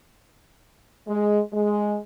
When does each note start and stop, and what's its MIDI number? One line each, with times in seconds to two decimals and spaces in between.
1.08 1.40 56
1.53 1.97 56